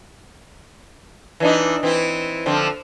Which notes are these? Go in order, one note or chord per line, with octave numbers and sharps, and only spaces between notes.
E3 D4 D#4
E3 C4 E4
D3 F3 C4